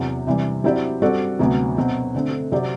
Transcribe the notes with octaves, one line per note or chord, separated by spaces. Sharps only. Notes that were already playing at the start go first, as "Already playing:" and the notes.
Already playing: E2 C3 F#3
C3 E3 G3
F#3 C4 E4 G4 D5
G3 C4 F#4 A4 D5
D2 C3 F#3 B3
B2 F#3 C4
D3 A3 C4
C3 F#3 C4 G4 D5